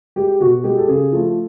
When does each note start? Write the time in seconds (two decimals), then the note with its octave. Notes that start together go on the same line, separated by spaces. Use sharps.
0.16 G#3 G4
0.40 B2 F#4
0.64 G#3 G4
0.77 A4
0.88 C#3 G#4
1.12 F3 A3 A4